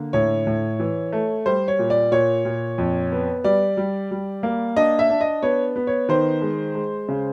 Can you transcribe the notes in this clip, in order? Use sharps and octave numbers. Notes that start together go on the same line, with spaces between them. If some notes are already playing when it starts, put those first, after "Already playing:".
Already playing: D3 A#3
A2 C#5
A2
E3
A3
G3 C5
C#5
A#2
D5
A#2 C#5
A#2
F2
B3
G3 D5
G3
G3
A#3
D4 D#5
E5
D4
D#5
B3 C#5
B3
C#5
D#3 C5
G#3
G#3
C#3